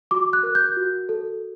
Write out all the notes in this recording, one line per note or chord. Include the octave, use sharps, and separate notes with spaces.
F#4 D6
F#6
A#4
G6
F#4
A4